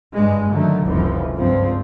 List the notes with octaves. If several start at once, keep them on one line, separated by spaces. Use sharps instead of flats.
F#1 G2 G#3
D3 D#3 F#3 A3
F1 C#2 F#2 E3 F3
C#2 G2 F3 C4